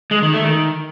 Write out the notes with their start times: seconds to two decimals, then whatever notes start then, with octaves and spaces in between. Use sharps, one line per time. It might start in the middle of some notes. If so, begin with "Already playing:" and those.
0.11 G#3
0.22 D#3
0.33 A3
0.45 D#3